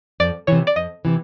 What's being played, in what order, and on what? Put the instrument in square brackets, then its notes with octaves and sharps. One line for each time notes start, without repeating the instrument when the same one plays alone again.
[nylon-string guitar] F2 [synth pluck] D5
[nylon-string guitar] C3 E3 [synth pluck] C#5
[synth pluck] D5
[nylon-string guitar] F2 [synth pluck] D#5
[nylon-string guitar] C3 E3